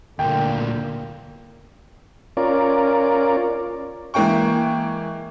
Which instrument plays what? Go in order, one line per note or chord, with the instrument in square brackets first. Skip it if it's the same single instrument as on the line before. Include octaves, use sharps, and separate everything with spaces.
[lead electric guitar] D2 A#2 [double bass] D3 A#3 [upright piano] G5
[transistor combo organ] C#4 F4 A#4 D5
[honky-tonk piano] E3 G#3 A#3 G5 C#6